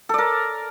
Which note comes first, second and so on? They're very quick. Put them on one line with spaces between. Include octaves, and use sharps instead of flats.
A4 D5 A#4